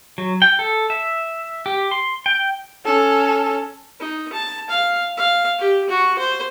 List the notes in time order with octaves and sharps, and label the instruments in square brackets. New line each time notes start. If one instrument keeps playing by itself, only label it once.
[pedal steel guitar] F#3
G5
A4
E5
G4
C6
G5
[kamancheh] C#4 A4
[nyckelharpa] D#4
A5
F5
F5
G4
F#4
C5